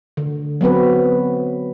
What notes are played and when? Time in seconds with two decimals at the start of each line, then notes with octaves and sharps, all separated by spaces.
0.17 D3
0.61 F#3 B3 C4 B4